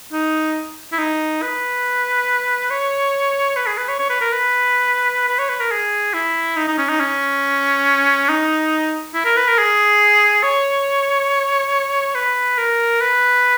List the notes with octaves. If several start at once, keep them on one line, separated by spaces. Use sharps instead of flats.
D#4
E4
D#4
B4
C#5
B4
G#4
B4
C#5
C#5
B4
A#4
B4
B4
C#5
B4
A#4
G#4
E4
D#4
D#4
C#4
D#4
C#4
D#4
E4
A#4
B4
A#4
G#4
C#5
B4
A#4
B4